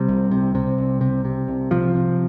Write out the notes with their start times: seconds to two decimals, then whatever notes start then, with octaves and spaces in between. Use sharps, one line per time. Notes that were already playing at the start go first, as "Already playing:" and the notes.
Already playing: C3 G3
0.08 C2
0.31 C3
0.55 C3
0.78 C2
1.01 C3
1.25 C3
1.48 C2
1.71 C3 F3
1.95 C3